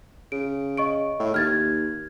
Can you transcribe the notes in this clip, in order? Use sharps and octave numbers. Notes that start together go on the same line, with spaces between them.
C#3 D7
D#5 C#6 D7
A2
D#2 F6 G#6 A6